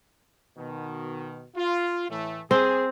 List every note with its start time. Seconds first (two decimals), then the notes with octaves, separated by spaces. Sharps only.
0.57 B2 D#3
1.56 F4
2.09 A2 E3 A3
2.51 C4 G#4